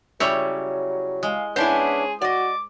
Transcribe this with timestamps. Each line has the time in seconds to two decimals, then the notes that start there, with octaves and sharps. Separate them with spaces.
0.20 C#3 F#3 G3 E4 C#5
1.23 G#3 F5
1.56 B3 C#4 D4 E4 G#4 C5
2.22 F#4 D5 D#5 D6